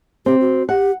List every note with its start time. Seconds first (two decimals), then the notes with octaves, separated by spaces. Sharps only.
0.26 C4 G4
0.40 F#4
0.69 G4 F#5